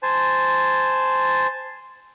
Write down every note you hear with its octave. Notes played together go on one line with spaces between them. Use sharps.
C5 G#5 A5